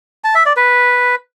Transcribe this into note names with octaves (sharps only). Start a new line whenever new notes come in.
A5
E5
D5
B4